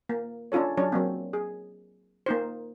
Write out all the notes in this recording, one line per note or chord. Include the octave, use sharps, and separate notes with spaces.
A#3
C#4 D4 F4 A4 C#5
F#3 C#4 D4 C#5
F#3 A#3 C4
G#4
A#3 D#4 C5